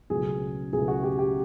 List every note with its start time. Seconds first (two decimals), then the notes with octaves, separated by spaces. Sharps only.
0.10 C#2 B2 F#3 A3 G#4
0.73 C#2 B2 F#3 A3 G#4
0.88 F#4
1.04 G4
1.19 G4